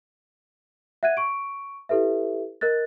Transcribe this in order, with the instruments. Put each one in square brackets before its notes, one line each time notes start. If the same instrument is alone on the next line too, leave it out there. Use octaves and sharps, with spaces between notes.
[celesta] E5 F#5 F#6 G#6 D#7
C#6 D7
E4 G4 A4 B4 E5
A#4 D#5 F#6 A6